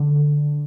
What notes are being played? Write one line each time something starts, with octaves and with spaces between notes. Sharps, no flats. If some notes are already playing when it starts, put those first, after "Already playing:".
Already playing: D3